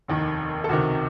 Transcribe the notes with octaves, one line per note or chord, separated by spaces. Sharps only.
F1 D#2 D#3
A4
C#2 C3 D#3 F#4